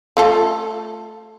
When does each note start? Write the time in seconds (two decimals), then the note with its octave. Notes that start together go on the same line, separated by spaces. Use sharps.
0.17 A3 F4 A4